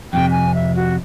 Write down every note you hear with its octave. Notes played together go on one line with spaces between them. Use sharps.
F2 A2 C3 G5
G#5
E5
F#4